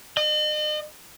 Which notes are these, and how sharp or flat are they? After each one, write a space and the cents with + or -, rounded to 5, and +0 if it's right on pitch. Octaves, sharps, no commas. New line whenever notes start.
D#5 -40